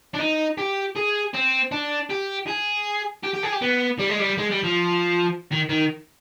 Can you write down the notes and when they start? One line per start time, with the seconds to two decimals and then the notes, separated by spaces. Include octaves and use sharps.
0.14 D4
0.20 D#4
0.58 G4
0.96 G#4
1.34 C4
1.72 D4
2.10 G4
2.48 G#4
3.23 G4
3.34 G4
3.43 G#4
3.52 G4
3.62 B3
3.99 G3
4.09 G#3
4.20 G3
4.38 G#3
4.51 G3
4.64 F3
5.52 D#3
5.69 D#3